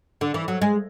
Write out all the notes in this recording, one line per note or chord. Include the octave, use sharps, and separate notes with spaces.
D3
E3
F#3
G#3